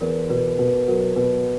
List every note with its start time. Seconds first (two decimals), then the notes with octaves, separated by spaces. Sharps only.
0.01 E2 A#4
0.30 B2 B4
0.59 B2 B4
0.88 F#3 A#4
1.16 B2 B4